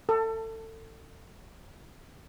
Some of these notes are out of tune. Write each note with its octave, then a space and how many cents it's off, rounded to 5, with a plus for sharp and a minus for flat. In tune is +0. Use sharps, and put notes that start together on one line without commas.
A4 +25